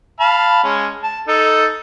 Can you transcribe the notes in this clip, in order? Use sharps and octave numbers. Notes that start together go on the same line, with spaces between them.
F5 A5 B5
G#3 C#4
A5
D#4 A4